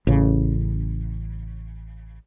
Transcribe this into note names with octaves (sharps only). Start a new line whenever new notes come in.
A1 C#3